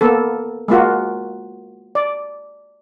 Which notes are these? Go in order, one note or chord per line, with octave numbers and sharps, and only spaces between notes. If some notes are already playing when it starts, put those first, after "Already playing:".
A#3 B3 A4
G#3 A#3 F4 F#4
D5